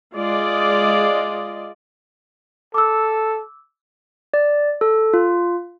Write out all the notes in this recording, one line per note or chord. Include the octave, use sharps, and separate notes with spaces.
G#3 F4 D5 D#5
A4 D6 E6
D5
A4
F4